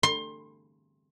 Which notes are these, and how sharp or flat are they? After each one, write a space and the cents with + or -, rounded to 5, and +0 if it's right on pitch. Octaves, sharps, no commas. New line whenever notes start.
C6 +25